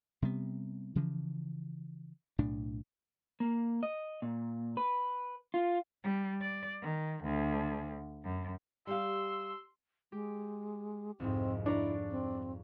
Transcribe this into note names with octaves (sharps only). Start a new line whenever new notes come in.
C3 G3 B3
C#3 E3 F3
B1 A2 D4
A#3
D#5
A#2
B4
F4
G3
D5
D#3
D2
F#2
G3 G4 F5 C6 E6
G#3 G4
C2 F2 G#2 C4
D4 E4 D5 A#5 C#6
C4